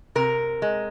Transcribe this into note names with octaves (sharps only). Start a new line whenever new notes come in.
C3 A#4
G#3